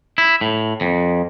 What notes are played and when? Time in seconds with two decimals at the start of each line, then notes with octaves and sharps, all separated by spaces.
0.18 E4
0.41 A2
0.81 F2